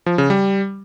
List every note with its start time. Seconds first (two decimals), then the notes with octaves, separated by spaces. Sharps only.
0.06 F3
0.18 C#3
0.30 G3